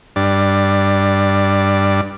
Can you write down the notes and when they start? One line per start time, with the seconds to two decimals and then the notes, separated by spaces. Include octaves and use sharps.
0.16 G2 D4